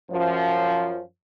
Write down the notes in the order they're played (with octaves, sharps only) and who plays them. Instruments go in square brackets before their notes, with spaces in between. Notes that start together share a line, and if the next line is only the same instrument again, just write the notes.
[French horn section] F#2 F3